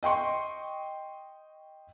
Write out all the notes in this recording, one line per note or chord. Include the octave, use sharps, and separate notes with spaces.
D#5 G5 C6 C#6